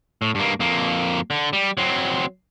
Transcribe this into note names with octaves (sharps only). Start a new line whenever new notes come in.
A2
G2 A#3
F2 A#3
D3
G3
F#3 C4